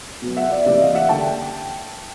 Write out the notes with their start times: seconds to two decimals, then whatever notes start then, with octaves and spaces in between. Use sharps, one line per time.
0.22 B2 F#3 B3
0.37 E5 F#5
0.51 D5 E5
0.66 C3 E3 G3 A#3 D5 E5
0.80 D#5 F5
0.95 E5 F#5
1.09 D3 G3 A#3 G5 A5